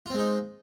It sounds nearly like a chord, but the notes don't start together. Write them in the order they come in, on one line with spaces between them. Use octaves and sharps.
F4 C4 G#3 D#4